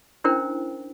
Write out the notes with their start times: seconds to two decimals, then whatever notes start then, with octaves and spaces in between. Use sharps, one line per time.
0.24 C#4 D4 E4 A#4 C5 G5